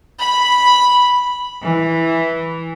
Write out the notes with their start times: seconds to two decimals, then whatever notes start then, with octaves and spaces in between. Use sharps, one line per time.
0.20 B5
1.63 E3